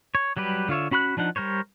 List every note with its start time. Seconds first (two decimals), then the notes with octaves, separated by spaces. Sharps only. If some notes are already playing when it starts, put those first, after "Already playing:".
0.15 C#5
0.37 F#3 G3 G4 B4
0.69 D3 F4 C#5 E5
0.91 C#4 F#4 B5 C6 F#6
1.17 F3 D4 D#4 F#5
1.36 G3 A#4 C5 C#5